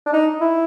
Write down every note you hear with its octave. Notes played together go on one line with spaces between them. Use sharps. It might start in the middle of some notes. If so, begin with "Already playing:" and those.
D4
D#4
E4